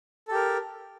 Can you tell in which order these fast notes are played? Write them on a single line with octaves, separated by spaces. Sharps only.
A4 G4 A#4